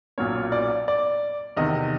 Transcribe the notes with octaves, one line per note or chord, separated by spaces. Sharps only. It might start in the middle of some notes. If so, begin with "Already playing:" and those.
B1 A#2 F#3 A#3 C#4 C#5
D5
D5
E2 C3 D#3 D#5